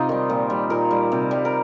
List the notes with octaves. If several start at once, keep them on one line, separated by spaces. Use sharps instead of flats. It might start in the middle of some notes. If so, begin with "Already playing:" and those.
Already playing: C3 D#4 F4 G4
D#3 G3
A#2
G3
A#2 A#4
G3
C3
G3
A#4